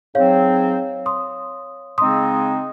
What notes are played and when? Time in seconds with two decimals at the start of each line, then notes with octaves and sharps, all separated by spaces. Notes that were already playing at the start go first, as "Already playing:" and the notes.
0.14 G#2 F#3 C4 C#5 F5
1.06 C6 D#6
1.98 C#3 G#3 C4 D#4 C6 D#6